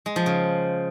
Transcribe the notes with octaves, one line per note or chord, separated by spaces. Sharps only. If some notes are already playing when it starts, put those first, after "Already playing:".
G#3
F3
C#3